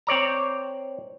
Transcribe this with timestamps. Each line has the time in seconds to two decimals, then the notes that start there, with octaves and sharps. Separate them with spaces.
0.07 C4 C#5 D5 A#5